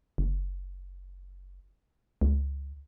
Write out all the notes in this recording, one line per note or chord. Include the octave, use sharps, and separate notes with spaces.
F#1
C#2